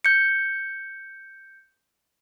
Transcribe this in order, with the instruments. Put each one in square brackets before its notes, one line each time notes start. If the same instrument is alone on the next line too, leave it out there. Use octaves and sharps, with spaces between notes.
[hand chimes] G6 C#7